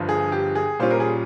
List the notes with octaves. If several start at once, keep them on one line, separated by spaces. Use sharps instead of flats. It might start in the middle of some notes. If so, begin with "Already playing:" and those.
Already playing: G1 G2 F3
G#4
G4
G#4
A#2 G3 C#4 F4 C5
A#4
G#4